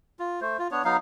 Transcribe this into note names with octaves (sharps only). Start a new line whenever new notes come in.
F4
A3 C5
F4
B3 D4 C#5
F#3 B3 D#4 F5